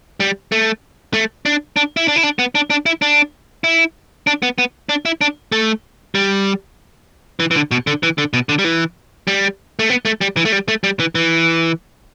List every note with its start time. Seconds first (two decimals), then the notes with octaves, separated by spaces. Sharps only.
0.20 G3
0.52 A3
1.14 A3
1.46 D4
1.76 D4
1.97 E4
2.08 D4
2.16 E4
2.23 D4
2.39 B3
2.55 D4
2.70 D4
2.86 E4
3.02 D4
3.64 E4
4.27 D4
4.42 B3
4.58 B3
4.89 D4
5.05 E4
5.21 D4
5.52 A3
6.15 G3
7.40 E3
7.51 E3
7.55 D3
7.71 B2
7.87 D3
8.03 E3
8.18 D3
8.33 B2
8.49 D3
8.59 G3
8.64 E3
9.28 G3
9.79 A3
9.90 B3
10.05 A3
10.21 G3
10.37 E3
10.45 A3
10.52 G3
10.68 A3
10.84 G3
11.00 E3
11.15 E3